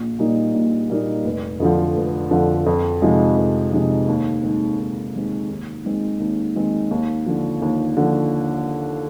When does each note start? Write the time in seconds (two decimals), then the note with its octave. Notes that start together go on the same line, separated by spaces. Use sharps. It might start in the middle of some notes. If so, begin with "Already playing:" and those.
Already playing: A#1
0.19 A#2 G3 A#3 D#4
0.54 A#1
0.90 A#2 G3 A#3 D#4
1.25 F1
1.60 F2 D3 F3
1.96 F1
2.31 F2 D3 F3
2.66 F2
3.02 C3 F3 G#3 D#4
3.37 F2
3.73 C3 F3 G#3 D#4
4.08 D#2
4.43 D#3 G#3 C4
4.79 D#2
5.14 D#3 G#3 C4
5.49 D#2
5.85 D#3 G#3 C4
6.20 D#2
6.56 D#3 G#3 C4
6.91 D#2
7.26 D3 F3
7.62 D#2
7.97 D3 F3